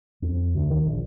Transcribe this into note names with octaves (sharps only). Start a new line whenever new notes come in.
F2
D2
D#3
A#1